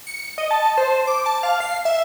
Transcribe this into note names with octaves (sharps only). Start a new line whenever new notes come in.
C#7
D#5
A5
C5
D6
A5
F5
C7
E5